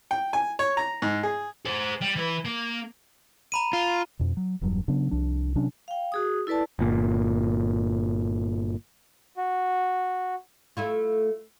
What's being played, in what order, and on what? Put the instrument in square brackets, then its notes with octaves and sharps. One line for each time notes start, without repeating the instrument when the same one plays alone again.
[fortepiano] G5
G#5
C#5
A#5
G#2
G#4
[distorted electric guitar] G#4 C5
G3
E3 B4
A#3
[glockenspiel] A#5 B5 D#7
[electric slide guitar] F4
[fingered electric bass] F2 B2
F#3
E1 E2 G2 F#3
C#3 F#3 B3 D4
C2 F3 D4
C3 F#3 C#4 D4
[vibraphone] F5 G5
F#4 G#4 D#6
E4 A4 B4 D5 A5
[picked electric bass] G1 A#2
[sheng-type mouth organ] F#4
[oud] A3 E4 F4